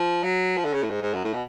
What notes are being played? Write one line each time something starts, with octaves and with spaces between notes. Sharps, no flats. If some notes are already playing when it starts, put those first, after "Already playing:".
Already playing: F3
F#3
F3
D3
C#3
A2
G#2
G#2
F#2
A2
B2